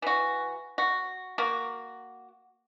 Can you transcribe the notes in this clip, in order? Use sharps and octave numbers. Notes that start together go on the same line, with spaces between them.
E3 F#4
F#4
A#3 F#4